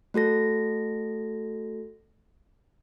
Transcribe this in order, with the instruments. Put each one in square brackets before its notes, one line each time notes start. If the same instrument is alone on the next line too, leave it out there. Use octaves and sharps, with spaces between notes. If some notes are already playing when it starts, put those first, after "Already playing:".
[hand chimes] A3 F#4 A4 A#6